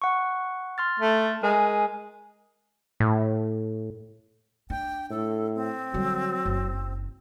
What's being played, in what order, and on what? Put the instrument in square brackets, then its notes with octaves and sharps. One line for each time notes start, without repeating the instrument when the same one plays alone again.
[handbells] F#5 C#6
C6 F6 A6
[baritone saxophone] A3
[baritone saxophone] G#3 [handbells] A#4 G#5
[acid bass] A2
[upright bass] D4 [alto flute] G5
[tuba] A2 [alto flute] A4
[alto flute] C4
[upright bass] D3 G3 [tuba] F#3
[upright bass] F#1